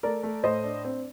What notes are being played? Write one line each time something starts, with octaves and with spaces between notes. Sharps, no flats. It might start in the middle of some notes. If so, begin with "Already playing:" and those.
A3 A#4 D5
A3
A2 C5 D#5
D4
C4